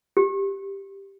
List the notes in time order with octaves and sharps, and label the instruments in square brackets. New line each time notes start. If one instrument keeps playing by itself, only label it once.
[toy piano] G4